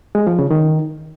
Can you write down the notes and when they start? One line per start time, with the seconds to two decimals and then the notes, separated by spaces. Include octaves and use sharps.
0.15 G#3
0.27 F3
0.39 C#3
0.51 D#3